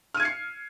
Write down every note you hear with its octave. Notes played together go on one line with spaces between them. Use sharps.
F6 G#6 C7 C#7 D#7